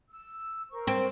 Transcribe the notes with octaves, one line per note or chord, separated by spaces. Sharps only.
E6
A#4 C5 C#6
C4